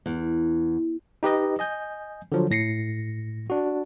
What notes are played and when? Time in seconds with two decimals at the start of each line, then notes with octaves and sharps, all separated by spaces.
0.06 E2
1.23 D#4 G4 B4 D#5
1.59 D#5 G#5 G6
2.32 D3 F3 F#3
2.51 A2 A#6 C7 C#7
3.50 D4 F#4